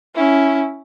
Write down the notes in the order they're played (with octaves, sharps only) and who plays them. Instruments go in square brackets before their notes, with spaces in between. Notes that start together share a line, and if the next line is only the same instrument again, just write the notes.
[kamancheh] C#4 E4